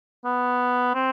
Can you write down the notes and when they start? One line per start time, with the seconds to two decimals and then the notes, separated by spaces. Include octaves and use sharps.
0.25 B3
0.94 C4